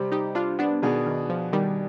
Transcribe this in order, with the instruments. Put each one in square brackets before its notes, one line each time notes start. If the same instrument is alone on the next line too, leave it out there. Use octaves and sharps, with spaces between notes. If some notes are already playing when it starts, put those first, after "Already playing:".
Already playing: [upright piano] C3 G3 C4
[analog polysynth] D#4 G4
D4 F4
B3 D4
[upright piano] B2 B3 D4 G#4 [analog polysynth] D#3
[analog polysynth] D#3
F3
D#3 G3